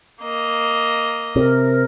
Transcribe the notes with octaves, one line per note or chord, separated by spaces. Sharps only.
A#3 D#5
C3 A#4